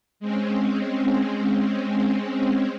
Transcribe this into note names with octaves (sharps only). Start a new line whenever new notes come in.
G#3 C4 C#4